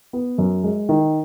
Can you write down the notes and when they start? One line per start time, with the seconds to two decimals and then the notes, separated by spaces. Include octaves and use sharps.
0.13 B3
0.38 F#2
0.64 G#3
0.89 D#3